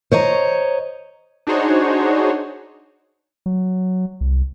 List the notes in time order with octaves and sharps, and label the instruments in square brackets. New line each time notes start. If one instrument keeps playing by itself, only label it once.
[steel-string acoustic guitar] C5 C#5 D#5 A#5
[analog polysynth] D4 D#4 F#4 G#4 C5 C#5
[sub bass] F#3
C2